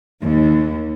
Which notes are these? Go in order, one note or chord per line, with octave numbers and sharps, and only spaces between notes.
D#2